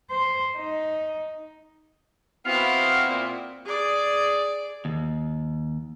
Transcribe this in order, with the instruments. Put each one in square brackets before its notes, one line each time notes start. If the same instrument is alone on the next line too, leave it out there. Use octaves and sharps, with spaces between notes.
[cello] C5
D#4
[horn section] B3 F#4 F5 [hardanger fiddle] C4 E4
[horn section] A#2
[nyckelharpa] G#4 D5
[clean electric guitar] D#2